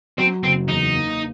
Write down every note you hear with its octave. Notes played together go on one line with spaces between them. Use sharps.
F#3 C4
F#1 C4
E2 D#4
A#3